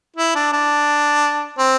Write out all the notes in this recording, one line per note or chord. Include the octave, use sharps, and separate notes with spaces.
E4
D4
D4
C4